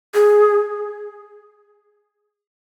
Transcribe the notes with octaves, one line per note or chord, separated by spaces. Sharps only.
G#4